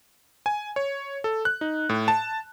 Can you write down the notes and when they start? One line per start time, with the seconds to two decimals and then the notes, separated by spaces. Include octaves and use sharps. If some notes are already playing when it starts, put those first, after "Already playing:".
0.46 G#5
0.76 C#5
1.24 A4
1.45 F#6
1.61 D#4
1.89 A2
2.08 A5